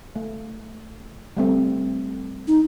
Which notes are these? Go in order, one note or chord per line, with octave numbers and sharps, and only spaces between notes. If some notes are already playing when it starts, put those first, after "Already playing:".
A3
G3 A3 C4
D#4